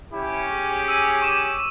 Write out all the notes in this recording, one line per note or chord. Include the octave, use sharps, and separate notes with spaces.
C#4 E4 G4
G#4
E6 D#7
C#6 D6 E7